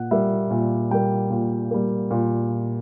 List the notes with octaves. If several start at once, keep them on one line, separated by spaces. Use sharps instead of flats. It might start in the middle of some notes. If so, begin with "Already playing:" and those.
Already playing: A#2 F#5
G3 A#3 E5
A#2
G3 A#3 G5
A#2
G3 A#3
A#2